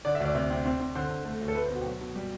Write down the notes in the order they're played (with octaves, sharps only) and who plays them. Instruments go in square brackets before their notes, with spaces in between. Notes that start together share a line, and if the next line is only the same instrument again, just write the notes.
[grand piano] D3 D5
E5
D2
D5
C3
C4
C4
C4
D3 C5
D3
A3
D2
A4
A3 B4
C5
B2 F#4
G4
F#3 F#4
B2
G3